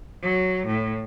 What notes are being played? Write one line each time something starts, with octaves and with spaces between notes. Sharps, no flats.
F#3
A2